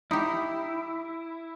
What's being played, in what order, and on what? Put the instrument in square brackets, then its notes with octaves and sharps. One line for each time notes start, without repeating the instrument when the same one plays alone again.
[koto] D#4 G4 [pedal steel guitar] E4